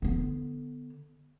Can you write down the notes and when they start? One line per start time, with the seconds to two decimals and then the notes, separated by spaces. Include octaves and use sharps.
0.02 D3 B3